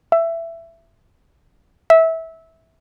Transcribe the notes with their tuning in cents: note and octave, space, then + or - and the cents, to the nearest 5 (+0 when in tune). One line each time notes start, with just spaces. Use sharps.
E5 +15
E5 -20